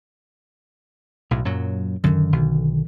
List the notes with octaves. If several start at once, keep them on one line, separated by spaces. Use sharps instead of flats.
B1 A2
F#2 A#2 F#3
F#2 D3 D#3
B1